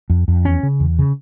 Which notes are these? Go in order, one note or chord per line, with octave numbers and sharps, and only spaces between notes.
F2
F2
E2 C#4
C#3
E2
C#3